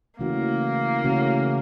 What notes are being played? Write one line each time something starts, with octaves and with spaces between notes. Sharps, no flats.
C#3 E3 A3 A#3 C#4 F#4
C#3 E3 A3 C#4 F#4